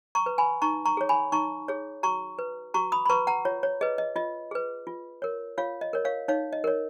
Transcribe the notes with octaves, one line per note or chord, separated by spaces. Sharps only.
A#5 C#6
B4
G#5 B5
D#4 A#5 C#6
A#5 C#6
G#4 C#5
G#5 B5
D#4 A#5 C#6
G#4 C#5
F#4 A#5 C#6
B4
F#4 A#5 C#6
B5 D#6
B5
B4 A#5 C#6
F#5 A#5
F4 C#5
C#5
G#4 B4 D#5
D#5
F4 D#5
G#4 B4
F4
A#4 C#5
F4 C#5 F5
D#5
A#4 C#5
C#5 F5
D#4 C#5 F5
D#5
A#4 C#5